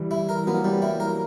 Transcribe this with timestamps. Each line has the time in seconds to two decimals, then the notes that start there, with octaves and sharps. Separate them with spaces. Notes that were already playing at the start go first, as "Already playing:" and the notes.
Already playing: E3 G3
0.11 E4
0.29 A#4
0.47 F#3 A#3 B3
0.65 G3
0.82 E4
1.00 A#4